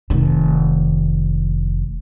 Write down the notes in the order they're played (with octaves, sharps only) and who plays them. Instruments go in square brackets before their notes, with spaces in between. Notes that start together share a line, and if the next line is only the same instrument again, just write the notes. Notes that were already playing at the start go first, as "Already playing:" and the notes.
[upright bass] F1 D#3